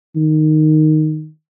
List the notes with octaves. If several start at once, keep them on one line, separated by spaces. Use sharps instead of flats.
D#3